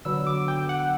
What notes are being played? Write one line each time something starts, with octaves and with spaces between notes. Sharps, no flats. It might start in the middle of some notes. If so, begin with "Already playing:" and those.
D3 F#3 B3 E6
D6
G5
F#5